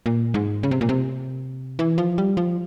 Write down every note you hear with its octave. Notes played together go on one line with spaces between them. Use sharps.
A#2
G#2
C#3
C3
A#2
C3
E3
F3
G3
F3